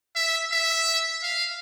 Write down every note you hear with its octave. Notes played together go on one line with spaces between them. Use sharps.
E5
E5
F5